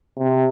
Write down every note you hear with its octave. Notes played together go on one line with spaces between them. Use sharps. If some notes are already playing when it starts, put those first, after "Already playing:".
C3